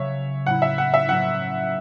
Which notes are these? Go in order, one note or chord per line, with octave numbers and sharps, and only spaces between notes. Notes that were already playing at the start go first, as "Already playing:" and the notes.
Already playing: C#3 F#3 C#4 C#5 E5
A2 F#3 C#4 E4 F#5
E5
F#5
E5
A2 F#3 C#4 E4 F#5